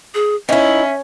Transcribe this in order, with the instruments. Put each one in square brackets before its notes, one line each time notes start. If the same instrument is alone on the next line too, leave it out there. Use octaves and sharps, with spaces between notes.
[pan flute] G#4
[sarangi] C#4 [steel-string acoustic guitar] D#4 E4 [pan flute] E5